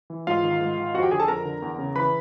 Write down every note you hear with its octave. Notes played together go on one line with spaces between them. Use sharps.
E3
G#2 F4 F5
D#3
G#2
D#3
F2 F#4 F#5
G4 G5
D3 G#4 G#5
A4 A5
F2 A#4 A#5
D3
E2
C#3
E3 B4 B5